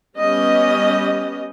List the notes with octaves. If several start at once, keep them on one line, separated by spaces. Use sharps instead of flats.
G3 B3 C#4 G4 D#5